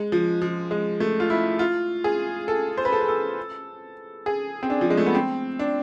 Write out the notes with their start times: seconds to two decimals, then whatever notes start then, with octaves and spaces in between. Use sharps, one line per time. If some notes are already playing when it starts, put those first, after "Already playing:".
Already playing: G#3
0.12 F3
0.42 F3
0.71 G#3
1.00 A3
1.20 F4
1.30 E4
1.59 F4
2.04 G#4
2.48 A4
2.77 C5
2.85 B4
2.92 A4
3.01 B4
3.08 A4
4.26 G#4
4.63 C4
4.70 D4
4.81 F3
4.90 G#3
4.97 A3
5.06 B3
5.15 C4
5.59 D4